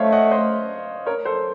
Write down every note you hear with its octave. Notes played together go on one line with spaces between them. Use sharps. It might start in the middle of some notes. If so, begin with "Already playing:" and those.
Already playing: A3 C5 C#5 D#5 F5
D#5 F#5
C5 D#5
A#4 C#5
A4 C5